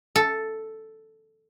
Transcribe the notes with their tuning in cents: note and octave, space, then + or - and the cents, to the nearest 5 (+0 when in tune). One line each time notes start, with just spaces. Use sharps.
A4 +0